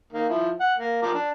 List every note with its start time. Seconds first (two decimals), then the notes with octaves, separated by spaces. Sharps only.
0.12 D#3 A#3
0.29 F3 E4
0.60 F#5
0.77 A#3
1.02 F3 A#4 D6
1.14 D4